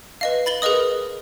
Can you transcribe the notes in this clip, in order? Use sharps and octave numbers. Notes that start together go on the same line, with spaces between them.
B4 D#5 F5
B5 A6 F#7 G7
G#4 A#4 B4 D#5 D#6